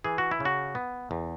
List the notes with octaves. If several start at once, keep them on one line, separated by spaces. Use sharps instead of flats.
E3 G#4
F#4
E4
C#3
F#4
B3
E2